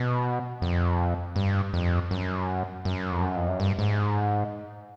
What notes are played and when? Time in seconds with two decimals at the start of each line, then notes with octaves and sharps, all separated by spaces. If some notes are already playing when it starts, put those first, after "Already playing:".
Already playing: B2
0.62 F2
1.36 G2
1.73 F2
2.11 F#2
2.85 F#2
3.12 F2
3.22 F#2
3.36 F2
3.48 F#2
3.60 G2
3.79 G#2